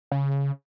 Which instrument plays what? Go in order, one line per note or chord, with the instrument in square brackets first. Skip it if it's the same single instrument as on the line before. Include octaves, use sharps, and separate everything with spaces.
[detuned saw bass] C#3